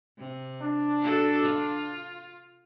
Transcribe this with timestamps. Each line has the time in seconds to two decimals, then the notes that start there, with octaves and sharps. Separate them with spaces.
0.18 C3
0.62 D4
1.01 F#4 A4
1.42 F4